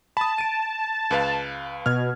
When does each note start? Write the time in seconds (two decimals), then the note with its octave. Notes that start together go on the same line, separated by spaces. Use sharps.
0.17 A5 B5 D#6
0.38 D7 D#7
1.11 C#2 B4 F5
1.86 B2 F6 G#6